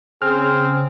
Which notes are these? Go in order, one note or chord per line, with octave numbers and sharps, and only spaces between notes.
C#3 C4 G#4 F6